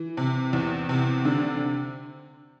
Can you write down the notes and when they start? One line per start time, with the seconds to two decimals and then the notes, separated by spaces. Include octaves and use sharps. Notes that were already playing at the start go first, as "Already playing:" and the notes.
Already playing: E3
0.17 C3
0.53 E2
0.89 C3
1.25 D3